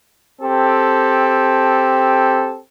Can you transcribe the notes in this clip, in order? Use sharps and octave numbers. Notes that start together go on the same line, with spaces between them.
C4 G4 A4